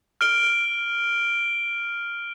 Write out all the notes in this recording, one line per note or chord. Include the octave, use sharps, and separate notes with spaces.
F6 D7 G7